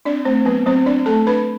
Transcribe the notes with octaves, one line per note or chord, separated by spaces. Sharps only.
C4 D4 D5
A3 C4 C5
F#3 B3 B4
F#3 C4 C5
C4 D4 D5
A3 A4 A5
D4 B4 B5